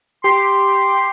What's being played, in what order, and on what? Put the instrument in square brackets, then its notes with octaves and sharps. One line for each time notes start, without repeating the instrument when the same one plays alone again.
[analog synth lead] G4 [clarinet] C6